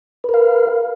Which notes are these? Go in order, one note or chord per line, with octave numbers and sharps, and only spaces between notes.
A#4 B4 F5